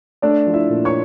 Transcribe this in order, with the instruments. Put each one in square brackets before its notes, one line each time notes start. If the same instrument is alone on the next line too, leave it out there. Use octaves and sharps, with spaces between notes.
[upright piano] A3 D4 D5
F3
E4 E5
A#2
C#5 C#6